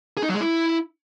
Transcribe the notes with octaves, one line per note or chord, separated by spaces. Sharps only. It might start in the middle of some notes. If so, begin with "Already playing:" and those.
G#4
D#4
F#3
G#3
E4